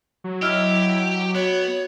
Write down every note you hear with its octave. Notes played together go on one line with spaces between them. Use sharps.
F#3
E4 G4 D#5 E6 F6
B3 F#4 C#5